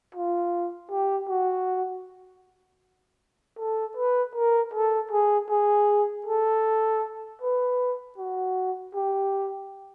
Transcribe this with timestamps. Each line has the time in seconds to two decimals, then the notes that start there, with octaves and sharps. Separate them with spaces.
0.14 F4
0.91 G4
1.29 F#4
3.59 A4
3.97 B4
4.35 A#4
4.74 A4
5.11 G#4
5.50 G#4
6.26 A4
7.41 B4
8.18 F#4
8.95 G4